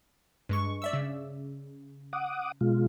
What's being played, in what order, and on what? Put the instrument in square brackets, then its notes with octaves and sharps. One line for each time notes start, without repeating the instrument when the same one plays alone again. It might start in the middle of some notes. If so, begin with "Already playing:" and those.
[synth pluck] G2 G#3 C#6
D5 E5 E6
C#3
[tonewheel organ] F#5 D6 D#6
B2 G#3 F4